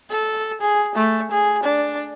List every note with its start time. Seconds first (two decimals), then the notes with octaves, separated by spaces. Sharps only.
0.10 A4
0.61 G#4
0.95 A3
1.31 G#4
1.63 D4